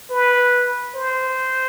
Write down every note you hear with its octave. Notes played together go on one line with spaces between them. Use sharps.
B4
C5